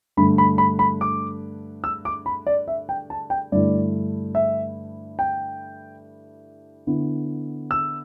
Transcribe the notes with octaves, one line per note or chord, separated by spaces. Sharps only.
G2 D3 A3 B5
B5
B5
B5
D6
E6
D6
B5
D5
E5
G5
A5
G5
G2 D3 A3 E4 D5
E5
G5
D3 B3 E4
E6